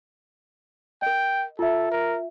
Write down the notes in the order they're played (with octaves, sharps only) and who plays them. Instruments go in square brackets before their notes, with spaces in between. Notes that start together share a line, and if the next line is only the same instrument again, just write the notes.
[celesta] A#4 D#5 [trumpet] G5
[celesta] F4 E5 [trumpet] A4
[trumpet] A#4